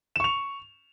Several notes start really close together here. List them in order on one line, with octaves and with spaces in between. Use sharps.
E7 C#6 F7